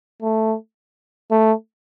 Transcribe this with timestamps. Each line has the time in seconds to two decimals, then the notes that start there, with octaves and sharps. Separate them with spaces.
0.22 A3
1.31 A3